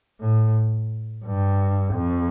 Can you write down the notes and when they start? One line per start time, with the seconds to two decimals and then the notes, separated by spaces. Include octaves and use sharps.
0.20 A2
1.25 G2
1.94 F2